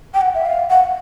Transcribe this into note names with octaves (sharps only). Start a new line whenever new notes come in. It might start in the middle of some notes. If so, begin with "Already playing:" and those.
G5
F#5
E5
F5
F#5